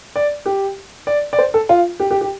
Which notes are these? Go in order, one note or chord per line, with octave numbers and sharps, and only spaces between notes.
D5
G4
D5
D5
C5
A4
F4
G4
G4
G4